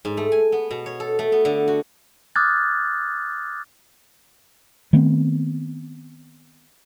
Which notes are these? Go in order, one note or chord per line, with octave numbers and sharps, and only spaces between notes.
G#2
A3
G#5
B3
B2
C#5
A4
A3
B3
D3
F#4
D6 D#6 F6 F#6 G#6 A6
D#3 A3 B3 C4